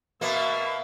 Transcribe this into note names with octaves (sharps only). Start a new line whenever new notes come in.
B2 A#3 E5